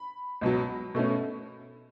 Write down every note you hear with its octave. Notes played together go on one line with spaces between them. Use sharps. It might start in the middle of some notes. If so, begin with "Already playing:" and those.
Already playing: B5
C#2 B2 F#3
B2 A3 C#4